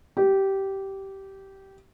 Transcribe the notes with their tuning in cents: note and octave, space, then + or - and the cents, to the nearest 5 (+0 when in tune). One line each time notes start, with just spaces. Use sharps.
G4 -15